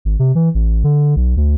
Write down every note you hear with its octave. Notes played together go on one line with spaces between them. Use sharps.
G#1
C3
E3
A1
D3
B1
D2